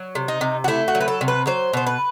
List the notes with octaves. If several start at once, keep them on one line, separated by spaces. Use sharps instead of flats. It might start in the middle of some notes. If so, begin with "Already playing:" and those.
Already playing: F#3
C3
D#4
C3
F#4
A3 E4
F#4
F#3
B4
A4
C3
B4
F#3 C5
B2 C5
B4